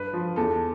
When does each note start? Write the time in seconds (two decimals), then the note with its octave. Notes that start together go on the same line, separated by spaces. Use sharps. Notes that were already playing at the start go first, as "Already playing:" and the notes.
Already playing: G2 B4
0.13 F3
0.36 E2 A4